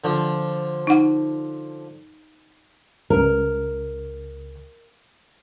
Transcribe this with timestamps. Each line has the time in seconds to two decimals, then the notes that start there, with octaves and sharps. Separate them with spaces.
0.04 D3 F3
0.87 D#4 F#5
3.10 C#2 A#4